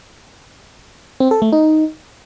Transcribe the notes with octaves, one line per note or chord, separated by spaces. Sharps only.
C4
A4
A3
D#4